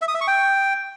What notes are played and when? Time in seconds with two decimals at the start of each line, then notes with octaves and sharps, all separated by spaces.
0.02 E5
0.08 D#6
0.15 E5
0.21 C#6
0.27 G5